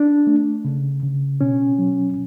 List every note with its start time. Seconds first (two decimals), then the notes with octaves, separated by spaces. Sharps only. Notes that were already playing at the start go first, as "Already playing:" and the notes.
Already playing: D4
0.27 A3
0.65 C#3
1.03 C#3
1.41 B2 C#4
1.79 F#3